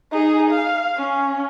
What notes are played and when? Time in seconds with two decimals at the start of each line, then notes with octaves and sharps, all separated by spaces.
0.11 D#4 G#4
0.50 F5
0.97 C#4